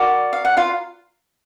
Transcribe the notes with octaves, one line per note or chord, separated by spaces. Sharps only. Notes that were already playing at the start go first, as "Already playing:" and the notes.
Already playing: F#4 A#4 D5
F5
F#5
F4 F5